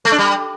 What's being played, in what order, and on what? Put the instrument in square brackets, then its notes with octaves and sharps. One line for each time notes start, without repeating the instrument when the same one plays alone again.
[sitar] A3
D4
G3